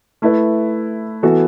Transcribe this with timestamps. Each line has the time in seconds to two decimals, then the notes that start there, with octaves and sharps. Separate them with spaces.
0.22 A3 E4 B4
1.23 E3 B3 F#4 A4